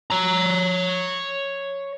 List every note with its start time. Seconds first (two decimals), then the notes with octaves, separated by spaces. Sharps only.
0.10 C#5 A#5